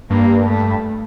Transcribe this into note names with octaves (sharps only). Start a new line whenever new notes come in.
G2 A#3
A3